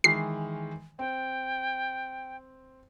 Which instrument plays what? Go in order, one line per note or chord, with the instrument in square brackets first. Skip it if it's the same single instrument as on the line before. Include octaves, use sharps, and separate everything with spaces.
[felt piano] D#3 E3 G#3 [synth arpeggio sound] C7
[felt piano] C4 [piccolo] G5